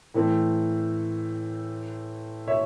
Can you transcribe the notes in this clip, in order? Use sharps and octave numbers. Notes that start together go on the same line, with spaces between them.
A2 E3 A3 C4
C#5 E5